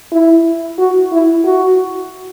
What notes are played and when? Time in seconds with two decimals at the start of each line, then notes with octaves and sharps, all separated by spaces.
0.12 E4
0.79 F#4
1.12 E4
1.45 F#4